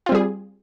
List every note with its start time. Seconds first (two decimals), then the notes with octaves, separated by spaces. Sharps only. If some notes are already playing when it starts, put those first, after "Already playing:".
0.06 F4
0.09 C4
0.12 G3
0.15 G#4